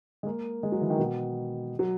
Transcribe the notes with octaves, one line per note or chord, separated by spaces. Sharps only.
G#3
A#3
G#3
F#3
E3
D#3
B2
F#3